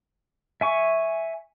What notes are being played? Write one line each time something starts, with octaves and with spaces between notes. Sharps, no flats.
E5 G#5 C#6